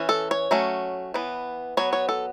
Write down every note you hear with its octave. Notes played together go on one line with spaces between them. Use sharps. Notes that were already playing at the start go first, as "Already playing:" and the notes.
Already playing: E3 C#4
A4
C#5
F#3 A3 C#4
E3 B3
F#3 B3 C#5
C#5
A4